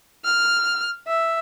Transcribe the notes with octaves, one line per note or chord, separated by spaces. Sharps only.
F6
E5